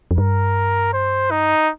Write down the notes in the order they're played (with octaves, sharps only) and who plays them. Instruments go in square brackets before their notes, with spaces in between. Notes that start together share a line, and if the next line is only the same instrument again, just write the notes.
[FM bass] F2
[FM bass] G2 [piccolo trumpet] A#4
[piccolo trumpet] C5
D#4